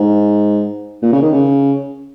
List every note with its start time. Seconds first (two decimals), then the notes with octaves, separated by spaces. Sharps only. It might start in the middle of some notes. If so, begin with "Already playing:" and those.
Already playing: G#2
1.02 A#2
1.12 C#3
1.22 D#3
1.32 C#3